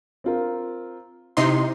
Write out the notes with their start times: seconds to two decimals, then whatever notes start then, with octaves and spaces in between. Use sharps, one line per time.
0.24 C4 F4 A#4
1.37 C3 D#4 E4 C6